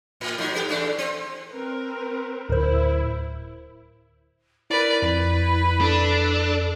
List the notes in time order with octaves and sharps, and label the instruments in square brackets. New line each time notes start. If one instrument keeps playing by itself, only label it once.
[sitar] A2
A2 F#3 D#4
B3 G4
E2 A3 D4
C4
[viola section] C4 A#4 B4
[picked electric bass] D1 [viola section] E4 [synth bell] A#4 C5
[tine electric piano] E4 [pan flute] A#4 [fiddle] B4 D5
[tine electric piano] F2 [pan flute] E4 [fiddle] B4
[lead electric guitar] D4 [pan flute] A4